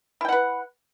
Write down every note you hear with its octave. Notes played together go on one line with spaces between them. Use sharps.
E4 B4 F#5 G5